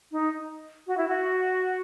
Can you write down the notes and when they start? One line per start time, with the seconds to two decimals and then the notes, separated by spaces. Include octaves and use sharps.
0.11 D#4
0.87 F#4
0.97 E4
1.08 F#4